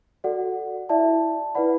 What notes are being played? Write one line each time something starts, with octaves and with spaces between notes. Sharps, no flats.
F#4 A4 D5 F#5
E4 D5 E5 A5
E4 B4 D5 F#5 B5